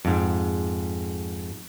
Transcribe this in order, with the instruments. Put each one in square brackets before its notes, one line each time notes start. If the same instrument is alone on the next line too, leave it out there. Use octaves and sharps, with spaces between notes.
[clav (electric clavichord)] F2 G#2